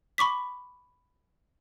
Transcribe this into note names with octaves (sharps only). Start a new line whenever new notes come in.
B5 C#6 D6 B6